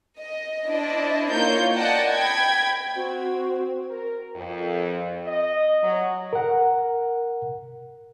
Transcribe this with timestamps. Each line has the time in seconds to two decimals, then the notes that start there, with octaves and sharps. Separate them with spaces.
0.17 D#5
0.68 D4 E4 C5 D5 D#5
1.30 A#3 D#4 F4 C#5 G6
1.74 D5 D#5 F#5 G5 A5
2.09 G5 B5 G#6
2.96 C4 F#4
3.90 A#4
4.35 F2
5.27 D#5
5.82 F#3
6.33 A#4 F#5